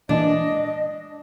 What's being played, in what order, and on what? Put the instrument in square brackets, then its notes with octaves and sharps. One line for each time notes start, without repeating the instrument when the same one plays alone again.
[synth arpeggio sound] A#2 E3 G#3 [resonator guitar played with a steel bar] D4 [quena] D#5